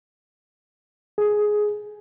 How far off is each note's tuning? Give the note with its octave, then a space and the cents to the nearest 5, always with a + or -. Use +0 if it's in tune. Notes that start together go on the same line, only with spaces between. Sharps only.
G#4 +10